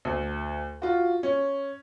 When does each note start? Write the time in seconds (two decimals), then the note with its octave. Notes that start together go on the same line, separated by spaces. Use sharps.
0.05 D2
0.82 F4 F#4
1.23 C#4